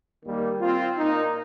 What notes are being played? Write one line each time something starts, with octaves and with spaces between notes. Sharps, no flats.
D#2 D#3 G3 A#3
C4 F4
A#2 A#3 D#4